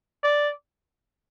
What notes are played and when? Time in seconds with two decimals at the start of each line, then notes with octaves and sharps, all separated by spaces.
0.24 D5